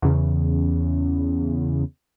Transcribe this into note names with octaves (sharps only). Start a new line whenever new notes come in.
E2 C#3